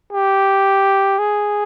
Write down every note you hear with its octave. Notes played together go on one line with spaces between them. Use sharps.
G4
G#4